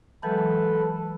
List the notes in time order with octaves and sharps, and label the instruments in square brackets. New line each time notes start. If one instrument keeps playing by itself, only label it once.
[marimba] E3 F#3 G#3 [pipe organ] A4 B4